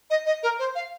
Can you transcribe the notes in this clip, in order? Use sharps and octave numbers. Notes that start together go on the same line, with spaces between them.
D#5
D#5
A#4
C5
F5